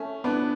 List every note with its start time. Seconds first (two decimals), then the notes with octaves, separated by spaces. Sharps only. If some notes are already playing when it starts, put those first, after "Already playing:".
Already playing: A3 C#4
0.24 B3 D4